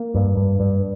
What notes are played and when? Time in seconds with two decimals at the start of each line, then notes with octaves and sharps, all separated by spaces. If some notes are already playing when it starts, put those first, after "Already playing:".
Already playing: A#3
0.15 G2
0.37 G2
0.60 G2